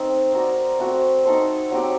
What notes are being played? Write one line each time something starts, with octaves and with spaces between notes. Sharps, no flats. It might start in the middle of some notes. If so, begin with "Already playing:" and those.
Already playing: A3 C4 D#4
C4 F#4 A#4 D5
A3 C4 F#4
D#4 A4 C5
F#3 C4 G4